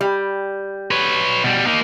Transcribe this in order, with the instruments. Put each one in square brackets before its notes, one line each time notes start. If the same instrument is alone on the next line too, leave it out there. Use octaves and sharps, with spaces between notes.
[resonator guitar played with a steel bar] G3
[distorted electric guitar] B4 C#5
B2 G3
A#3 D#4